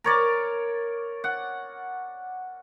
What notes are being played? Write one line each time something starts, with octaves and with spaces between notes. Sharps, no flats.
A#4 C#5 D5
F#5